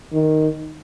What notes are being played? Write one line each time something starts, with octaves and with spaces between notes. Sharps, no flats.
D#3